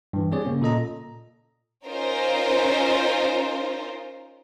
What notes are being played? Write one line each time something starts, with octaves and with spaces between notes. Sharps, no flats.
G2 E3
G3 C4 G#4 C#5 D5
C#3 A#3 C#4
A#2 A4 D#5 A#5
C#4 D#4 F4 A#4 C5